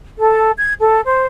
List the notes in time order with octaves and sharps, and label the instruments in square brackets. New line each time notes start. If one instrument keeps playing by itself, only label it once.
[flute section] A4
G#6
A4
C5